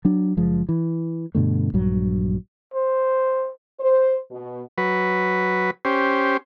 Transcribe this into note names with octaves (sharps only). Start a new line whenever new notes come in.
F#3 D4
F#1 F3 G#3
E3
G2 B2 D3 A3
A#1 G2 F#3
C5
C5
B2
F#3 B4
C#4 G4 C5